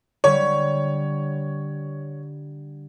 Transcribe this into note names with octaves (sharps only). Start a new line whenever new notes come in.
D3 G3 C#5